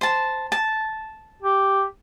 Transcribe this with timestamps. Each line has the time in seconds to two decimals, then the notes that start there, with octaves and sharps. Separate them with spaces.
0.01 C5 A5
0.52 A5
1.42 G4